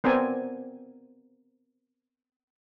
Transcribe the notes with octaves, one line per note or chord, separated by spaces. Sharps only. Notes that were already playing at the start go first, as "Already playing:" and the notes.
B3 C4 A#4 D5 G#5